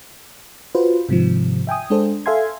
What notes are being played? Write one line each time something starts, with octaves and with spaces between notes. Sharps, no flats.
F4 F#4 B4 C5
G#2 C3 D#3 F3
E5 G5 G#5 D#6
G#3 D4 A4 C5
A4 E5 F5 G#5 C6 G#6